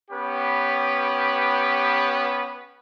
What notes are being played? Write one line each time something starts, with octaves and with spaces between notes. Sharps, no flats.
B3 C#4 G4 B4